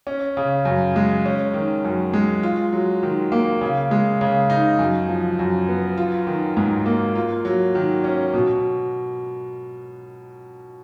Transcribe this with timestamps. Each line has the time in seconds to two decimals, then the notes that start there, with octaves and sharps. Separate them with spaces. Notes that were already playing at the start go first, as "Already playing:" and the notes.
0.07 C#4
0.37 C#3
0.65 F#2
0.96 G#3
1.26 C#4
1.54 D#3
1.85 F#2
2.13 G#3
2.43 F4
2.73 F#3
3.03 D#3
3.32 A#3
3.61 C#3
3.91 G#3
4.21 C#3
4.50 D#4
4.79 F#2
5.09 F3
5.39 F#2
5.69 B3
5.98 F4
6.27 D#3
6.57 G#2
6.86 A#3
7.15 F4
7.45 F#3
7.75 D#3
8.04 C#4
8.34 B2